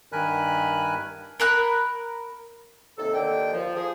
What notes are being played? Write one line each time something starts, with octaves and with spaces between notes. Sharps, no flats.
G2 D#3 A#4 G#5 B5 F#6
A#4 B5 F#6
D#2 C3 A4
D#2 D3 G5
F3
F3 G#4